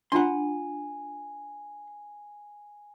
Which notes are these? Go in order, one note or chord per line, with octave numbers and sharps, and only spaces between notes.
D4 F4 F#5 G#5 A#5 C6